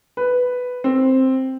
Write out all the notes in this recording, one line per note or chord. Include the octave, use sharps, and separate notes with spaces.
B4
C4